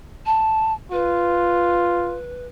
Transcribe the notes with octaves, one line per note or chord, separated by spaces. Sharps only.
A5
F4 B4